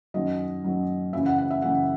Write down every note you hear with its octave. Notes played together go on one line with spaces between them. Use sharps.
F#2 D#3 F#3 D#5
F#2 D#3 F#3
F#2 C#3 E3 E5
F#5
F#5
E5
F#2 C#3 E3 F#5